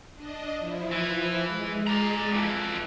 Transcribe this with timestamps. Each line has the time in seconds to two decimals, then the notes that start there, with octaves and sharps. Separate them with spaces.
0.15 D4 D#5
0.59 F3 E4
0.92 E3
1.46 G#3
1.87 D5 A#5
2.31 F2 E3